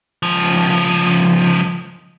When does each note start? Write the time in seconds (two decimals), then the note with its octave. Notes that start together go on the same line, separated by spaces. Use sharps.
0.23 C#2 F3